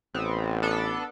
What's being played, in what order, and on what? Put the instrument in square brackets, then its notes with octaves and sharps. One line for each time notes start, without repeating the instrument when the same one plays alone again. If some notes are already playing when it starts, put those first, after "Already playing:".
[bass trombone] A1 [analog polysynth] B3 C4
[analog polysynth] B3 D4 A4